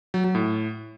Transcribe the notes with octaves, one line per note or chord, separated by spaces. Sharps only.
F#3
F#3
A2